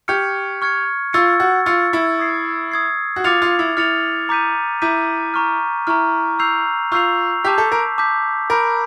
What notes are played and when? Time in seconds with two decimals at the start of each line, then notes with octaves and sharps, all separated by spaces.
0.08 G4 C#6 F6 G#6 C#7
0.62 C#6 F6 G#6 C#7
1.13 F4 C#6 E6 A6 C#7
1.40 F#4
1.66 F4 C#6 E6 A6 C#7
1.93 E4
2.20 D#6 G#6 C7
2.71 D#6 G#6 C7
3.16 F#4
3.24 F4 D6 F6 A6 C#7 F7
3.42 F4
3.59 E4
3.77 E4 D6 F6 A6 C#7 F7
4.29 A#5 D6 G6 B6 D#7
4.82 E4 A#5 D6 G6 B6 D#7
5.34 A#5 C#6 F6
5.87 E4 A#5 C#6 F6
6.39 C#6 E6 G6 C7 F7
6.92 F4 C#6 E6 G6 C7 F7
7.44 G4 A5 D6 G6 B6
7.58 A4
7.72 A#4
7.98 A5 D6 G6 B6
8.50 A#4 B5 D6 G6